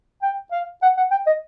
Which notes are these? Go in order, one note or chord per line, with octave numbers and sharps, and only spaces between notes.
G5
F5
F#5
F#5
G5
D#5